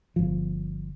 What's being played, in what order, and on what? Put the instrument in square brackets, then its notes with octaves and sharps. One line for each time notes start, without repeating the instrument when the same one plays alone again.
[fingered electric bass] G1 F3